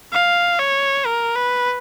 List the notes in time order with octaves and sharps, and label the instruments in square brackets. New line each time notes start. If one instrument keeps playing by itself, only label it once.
[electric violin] F5
C#5
A#4
B4